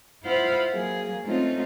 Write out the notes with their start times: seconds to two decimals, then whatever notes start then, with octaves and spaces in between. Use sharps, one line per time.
0.23 E4 F4 C5 F5 F#5 B5
0.72 F#3 A#3 G#4
1.24 A3 C4 C#4 D#4 F4